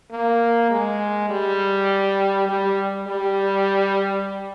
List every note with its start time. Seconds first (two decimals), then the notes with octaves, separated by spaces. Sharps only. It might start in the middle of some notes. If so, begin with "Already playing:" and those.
0.11 A#3
0.71 G#3
1.30 G3
2.49 G3
3.08 G3